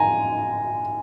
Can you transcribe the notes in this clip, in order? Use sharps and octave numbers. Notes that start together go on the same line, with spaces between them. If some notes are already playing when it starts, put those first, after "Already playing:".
Already playing: G#5 A#5